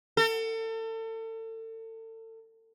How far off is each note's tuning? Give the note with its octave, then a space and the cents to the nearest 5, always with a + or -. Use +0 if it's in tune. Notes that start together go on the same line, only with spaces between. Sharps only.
A4 +35